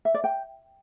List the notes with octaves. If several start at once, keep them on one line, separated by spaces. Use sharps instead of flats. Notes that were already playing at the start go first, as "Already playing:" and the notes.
E5
D5
G5